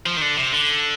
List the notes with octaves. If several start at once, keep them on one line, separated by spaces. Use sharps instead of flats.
F3
D#3
D3
C3
D3